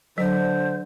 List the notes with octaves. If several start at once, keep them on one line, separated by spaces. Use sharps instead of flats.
D3 F#3 C5